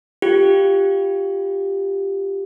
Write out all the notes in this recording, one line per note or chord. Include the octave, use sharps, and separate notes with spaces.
F4 G4